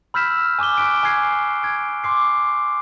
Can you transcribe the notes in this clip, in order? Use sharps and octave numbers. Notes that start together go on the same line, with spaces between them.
B5 E6 F6 G6 B6 E7
G#5 C#6 D6 F#6 G7
C#6 D6 F#6 B6 D7
G#5 C#6 G#6 C7
G#6 D7
C6 D6 C7